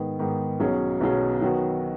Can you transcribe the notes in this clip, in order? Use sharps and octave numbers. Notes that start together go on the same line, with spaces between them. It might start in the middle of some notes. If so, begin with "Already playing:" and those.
Already playing: G#2 D#3 B3
G#2 D#3 B3
B1 B2 F#3 C#4 G#4
B1 B2 F#3 C#4 G#4
D#3 F#3 B3 F#4